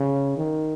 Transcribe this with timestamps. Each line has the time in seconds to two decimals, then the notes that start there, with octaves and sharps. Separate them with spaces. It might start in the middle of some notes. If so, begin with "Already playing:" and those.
Already playing: C#3
0.37 D#3